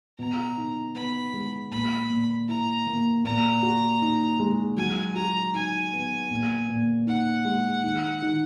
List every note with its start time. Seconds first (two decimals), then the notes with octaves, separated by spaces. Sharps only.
0.19 B2 A#5
0.58 D#4
0.95 B3 B5
1.33 G#3
1.71 A#2 B5
2.10 A#2
2.48 E4 A#5
2.87 A#3
3.25 A#2 A#5
3.63 F#4
4.02 D#4
4.40 G#3
4.77 F#3 G#5
5.15 F#4 A#5
5.54 D#4 G#5
5.93 B3
6.30 A#2
6.69 A#2
7.07 D#4 F#5
7.45 G#3
7.83 D#3
8.22 D#3